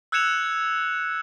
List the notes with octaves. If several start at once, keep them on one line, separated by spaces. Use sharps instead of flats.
E6 F#6 G#6 C#7 E7 F7